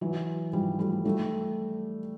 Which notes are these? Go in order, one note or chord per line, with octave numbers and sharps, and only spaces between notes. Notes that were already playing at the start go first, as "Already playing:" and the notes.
E3 F#3
F3 G3
G3 A3
G3 A3